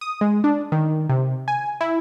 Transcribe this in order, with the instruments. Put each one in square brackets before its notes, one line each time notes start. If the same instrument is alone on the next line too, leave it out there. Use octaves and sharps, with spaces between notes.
[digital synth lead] D#6
G#3
D4
D#3
C3
G#5
E4